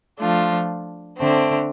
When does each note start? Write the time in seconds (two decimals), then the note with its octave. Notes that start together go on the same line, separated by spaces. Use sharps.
0.19 F3 A3 D4 F4
1.18 D3 A3 C4